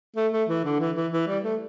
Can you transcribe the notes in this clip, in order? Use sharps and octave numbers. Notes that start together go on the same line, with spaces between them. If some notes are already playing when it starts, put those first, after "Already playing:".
A3
A3
E3
D3
E3
E3
E3
G3
A3